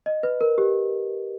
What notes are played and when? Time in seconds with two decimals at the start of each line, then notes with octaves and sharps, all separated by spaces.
0.06 D#5
0.23 B4
0.41 A#4
0.58 G4